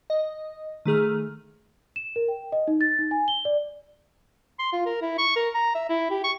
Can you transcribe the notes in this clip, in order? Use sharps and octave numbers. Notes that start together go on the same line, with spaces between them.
D#5
D#3 A3 G#4 F6
E7
A#4
G5
D#5
D#4
A6
D#4
G#5
G7
D5
C6
F4
A#4
E4
C#6
A#4
A#5
E5
E4
G4
C#6